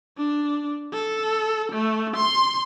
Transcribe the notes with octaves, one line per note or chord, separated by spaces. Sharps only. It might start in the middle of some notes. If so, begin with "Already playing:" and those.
D4
A4
A3
C6